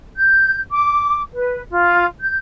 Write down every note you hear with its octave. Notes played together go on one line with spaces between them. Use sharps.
G6
D6
B4
F4
G6